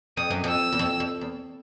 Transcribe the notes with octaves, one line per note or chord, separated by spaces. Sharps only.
F2 D#6
F#2
F2
E6
E2
F2
F2
E2